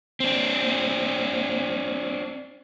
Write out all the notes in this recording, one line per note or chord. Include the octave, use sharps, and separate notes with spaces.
C4 D4